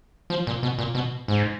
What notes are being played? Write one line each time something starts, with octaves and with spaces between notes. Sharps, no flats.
F3
A#2
B2
A#2
B2
G#2